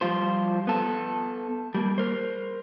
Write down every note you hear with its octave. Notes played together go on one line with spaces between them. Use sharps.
F3 G3 F4 C5
B3 A4
G3 A#3
A#4 C5